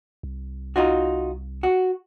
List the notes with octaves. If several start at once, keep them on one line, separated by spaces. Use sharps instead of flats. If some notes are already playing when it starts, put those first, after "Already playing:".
C2
D#4 F4 F#4
F#4